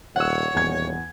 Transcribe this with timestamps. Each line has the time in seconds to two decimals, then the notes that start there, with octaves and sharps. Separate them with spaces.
0.16 D#1 C#5 F#5 E6
0.55 D#1 E2 G#6